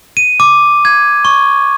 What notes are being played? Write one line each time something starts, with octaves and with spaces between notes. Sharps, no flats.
D#7
D6
G#6
C#6